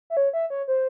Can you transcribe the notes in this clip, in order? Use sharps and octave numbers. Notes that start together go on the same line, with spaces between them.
E5
C#5
E5
C#5
C5